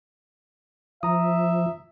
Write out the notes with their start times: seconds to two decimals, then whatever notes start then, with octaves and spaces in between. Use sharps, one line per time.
1.03 F3 E5 A#5 D#6